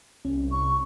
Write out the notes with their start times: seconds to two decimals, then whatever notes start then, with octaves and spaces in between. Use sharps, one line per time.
0.25 C2 C#4
0.52 C#6